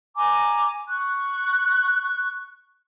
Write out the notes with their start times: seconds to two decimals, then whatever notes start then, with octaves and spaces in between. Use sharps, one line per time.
0.15 G#5 A#5 D6
0.88 C#6 F#6